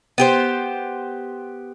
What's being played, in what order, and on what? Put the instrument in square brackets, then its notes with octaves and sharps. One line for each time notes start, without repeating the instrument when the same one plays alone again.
[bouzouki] B3 G4 C5